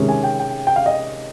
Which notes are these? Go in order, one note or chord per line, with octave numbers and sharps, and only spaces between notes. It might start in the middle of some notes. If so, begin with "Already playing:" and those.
Already playing: C3 D#3 G#3 C#4
G#5
G5
G5
G5
F5
D#5